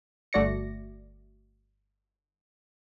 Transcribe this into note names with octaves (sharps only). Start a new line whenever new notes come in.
G1 A3 F#4 D5 A#6 C#7